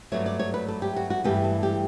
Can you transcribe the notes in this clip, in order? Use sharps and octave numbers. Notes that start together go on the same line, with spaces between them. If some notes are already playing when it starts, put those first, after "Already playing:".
G2 F#3 A3 C#5
D5
C#5
B4
A4
G4
F#4
F#4
G2 E3 A3 G4
A4
G4